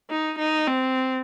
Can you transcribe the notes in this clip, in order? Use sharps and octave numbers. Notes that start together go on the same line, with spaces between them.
D#4
D#4
C4